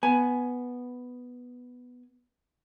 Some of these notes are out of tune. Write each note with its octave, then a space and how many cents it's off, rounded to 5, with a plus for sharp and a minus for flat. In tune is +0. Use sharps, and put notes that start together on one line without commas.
B3 +0 G#5 +15